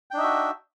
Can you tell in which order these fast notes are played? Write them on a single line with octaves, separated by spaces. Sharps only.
G5 D4 D#4 E5 F#4